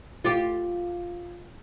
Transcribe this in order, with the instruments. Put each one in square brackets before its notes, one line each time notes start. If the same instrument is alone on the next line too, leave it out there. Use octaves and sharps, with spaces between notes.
[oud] F4 G4